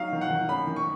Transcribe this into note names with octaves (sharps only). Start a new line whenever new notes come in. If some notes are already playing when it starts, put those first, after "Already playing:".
Already playing: F#3 D#4 F5
D#3
F#5
D#3
F#2 B5
D#3
C#6